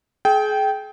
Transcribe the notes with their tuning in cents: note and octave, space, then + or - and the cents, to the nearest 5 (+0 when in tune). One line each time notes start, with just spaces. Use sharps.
G#4 +35 G5 -10